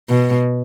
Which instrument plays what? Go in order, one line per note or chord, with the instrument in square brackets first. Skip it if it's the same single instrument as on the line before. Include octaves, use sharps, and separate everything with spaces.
[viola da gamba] B2